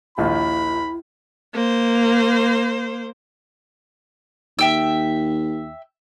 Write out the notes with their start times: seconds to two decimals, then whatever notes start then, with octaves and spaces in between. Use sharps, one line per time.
0.18 A#1 D#2 A#3 E4 B5
1.53 A#3 C5
4.59 D#2 E5 G5 E6